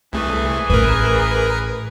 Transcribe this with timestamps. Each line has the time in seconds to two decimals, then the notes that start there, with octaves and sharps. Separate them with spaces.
0.13 C2 E3 A3 G#4
0.70 A1 A#4 B4